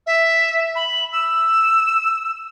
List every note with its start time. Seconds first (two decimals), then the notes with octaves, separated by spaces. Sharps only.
0.07 E5
0.75 B5
1.12 E6